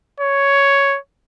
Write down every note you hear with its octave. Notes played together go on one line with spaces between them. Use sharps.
C#5